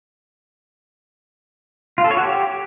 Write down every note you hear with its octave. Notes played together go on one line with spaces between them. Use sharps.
F4
A4
C#5
F#4
G4